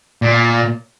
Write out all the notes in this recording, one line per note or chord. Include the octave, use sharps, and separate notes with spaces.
A#2